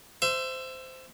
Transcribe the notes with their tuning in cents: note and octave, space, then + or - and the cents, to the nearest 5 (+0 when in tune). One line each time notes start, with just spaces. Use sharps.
C5 -15 E5 +20